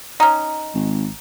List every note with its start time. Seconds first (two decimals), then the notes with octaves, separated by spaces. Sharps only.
0.20 C#4 D#4 A#5
0.74 G#1